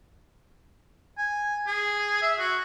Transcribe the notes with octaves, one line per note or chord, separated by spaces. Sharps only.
G#5
G#4
E5
F#4